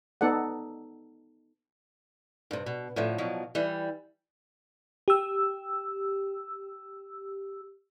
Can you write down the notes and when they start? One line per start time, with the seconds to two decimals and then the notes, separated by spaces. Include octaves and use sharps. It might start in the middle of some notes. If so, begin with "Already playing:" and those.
0.21 B3 D#4 A4 D5 F#5
2.51 G2 C3
2.66 B2
2.96 A2 D3 F3
3.18 B2 F3 F#3
3.55 E3 G3
5.08 G4 E6